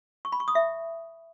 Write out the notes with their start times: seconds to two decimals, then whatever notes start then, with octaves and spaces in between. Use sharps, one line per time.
0.25 C#6
0.32 B5
0.40 C#6
0.48 D#6
0.55 E5